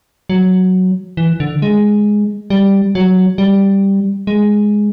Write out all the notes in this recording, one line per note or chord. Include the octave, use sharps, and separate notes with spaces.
F#3
E3
D3
G#3
G3
F#3
G3
G#3